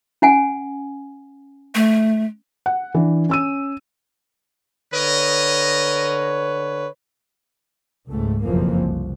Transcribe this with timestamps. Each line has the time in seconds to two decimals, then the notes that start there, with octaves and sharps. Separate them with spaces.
0.22 C#4 F#5 G#5
1.75 A3
2.66 F#5
2.94 E3 D4
3.29 C#4 E6 D#7
4.93 D3 A#4 B4 C#5 D#5
8.08 C#2 G#2 A3
8.43 F#1 B1 F2 E3 F3 A#3
8.76 C2